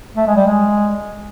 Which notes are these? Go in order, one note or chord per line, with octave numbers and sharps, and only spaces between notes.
A3
G#3
G3
G#3